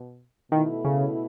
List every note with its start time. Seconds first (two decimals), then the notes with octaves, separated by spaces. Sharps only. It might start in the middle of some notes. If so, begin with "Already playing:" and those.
Already playing: B2
0.51 B2 D#3 A3 E4 A4
0.85 C#3